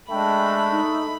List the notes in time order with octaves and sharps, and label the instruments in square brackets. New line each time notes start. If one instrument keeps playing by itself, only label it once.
[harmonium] G#3 D4 [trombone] A3 [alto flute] G5 [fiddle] B5
[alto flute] D#4